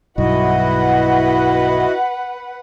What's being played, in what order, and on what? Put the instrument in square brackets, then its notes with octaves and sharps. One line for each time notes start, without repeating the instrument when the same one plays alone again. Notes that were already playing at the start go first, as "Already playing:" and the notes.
[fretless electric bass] B1 G2 [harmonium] E4 F#4 D#5 [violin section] B4 F#5